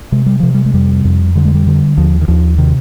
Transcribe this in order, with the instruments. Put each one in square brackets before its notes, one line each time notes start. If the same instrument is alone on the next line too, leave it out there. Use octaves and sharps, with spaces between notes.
[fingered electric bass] C3 G#3
G3
C3 F3
G3
G#3
F2 G3
F2
D3 G3
G#3
G3
D3
D#2 F3
D#3
D#2 F3
C3 D#3